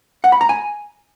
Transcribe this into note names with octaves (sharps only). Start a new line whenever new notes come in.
F#5
B5
A#5
G#5